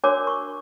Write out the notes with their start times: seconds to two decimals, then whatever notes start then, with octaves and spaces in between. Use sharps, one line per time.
0.04 D4 F#4 A#4 C#5 D6
0.27 C#6